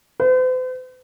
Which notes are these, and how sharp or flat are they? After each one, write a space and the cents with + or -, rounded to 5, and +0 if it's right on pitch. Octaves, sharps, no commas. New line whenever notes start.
C5 -45